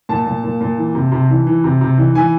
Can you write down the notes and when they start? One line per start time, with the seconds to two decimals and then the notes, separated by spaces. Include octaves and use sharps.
0.09 A#2 A5
0.27 A#2
0.44 A#2
0.61 A#2
0.77 E3
0.95 C3
1.12 C3
1.30 E3
1.47 E3
1.64 C3
1.81 C3
1.97 E3
2.15 E3 G#5